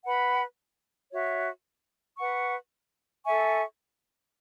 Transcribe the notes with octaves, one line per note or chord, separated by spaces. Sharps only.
B4 F#5 B5
F#4 C#5 E5
B4 F#5 C#6
A4 E5 G#5 C#6